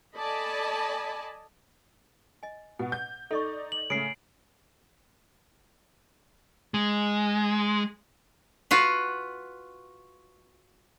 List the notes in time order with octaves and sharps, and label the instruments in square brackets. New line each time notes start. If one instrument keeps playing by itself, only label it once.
[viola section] A4 D5 D#5 G#5 A5 B5
[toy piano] D#5 G#5
[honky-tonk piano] B2 [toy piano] F#5
[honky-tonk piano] G6
[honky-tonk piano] D#4 D5 [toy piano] A4 D#5 C#6
[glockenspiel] F#7
[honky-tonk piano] C#3 A3 [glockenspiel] C7 D7
[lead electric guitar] G#3
[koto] F4 F#4 B4